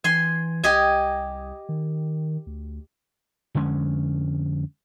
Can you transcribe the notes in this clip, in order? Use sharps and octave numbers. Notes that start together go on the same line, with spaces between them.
E3 G#5 C6
C2 G4 D#5 G#5
D#3
D2
F2 D3 G#3 C#4